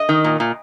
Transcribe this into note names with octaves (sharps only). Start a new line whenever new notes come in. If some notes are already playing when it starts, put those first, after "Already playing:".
Already playing: D#5
D#3
A#2
A#2